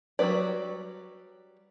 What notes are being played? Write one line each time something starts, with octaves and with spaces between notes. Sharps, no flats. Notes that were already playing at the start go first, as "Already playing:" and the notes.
F#3 G3 B3 B4 D5